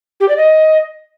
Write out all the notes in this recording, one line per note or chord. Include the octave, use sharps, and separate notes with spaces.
G4
D5
D#5